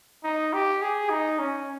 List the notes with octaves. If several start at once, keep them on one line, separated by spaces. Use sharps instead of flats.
D#4
G4
G#4
D#4
C#4